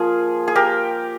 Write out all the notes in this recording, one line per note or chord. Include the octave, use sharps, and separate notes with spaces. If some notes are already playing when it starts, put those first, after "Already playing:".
Already playing: F3 A#3 F4 G#4
G#4
G4 A#4